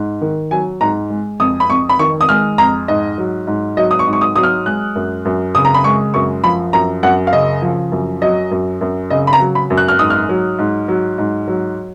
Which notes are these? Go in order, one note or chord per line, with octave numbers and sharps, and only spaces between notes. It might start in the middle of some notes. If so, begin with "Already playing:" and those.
Already playing: G#2
D#3
F#3 G#5
G#2 A#5
G#3
F2 D#6
B5
F2 C#6
B5
D#3 C#6
D#6
G#3 F6
F2 A#5
G#2 D#5
F#3
G#2
F#3 D#5
D#6
C#6
G#2
C#6
D#6
F#3 D#6
F6
G#3 F#6
F#2
F#2
C#3 D#6
A#5
B5
G#3 C#6
F#2 C#6
F3 B5
F#2 A#5
F#2 F#5
F5
C#3 D#5
F3
F#2
F#3 D#5
F#2
F#2
C#3 D#5
B5
A#5
F#3
B5
F#2
F#6
F6
G#2 D#6
F6
F#3
G#2
F#3
G#2
F#3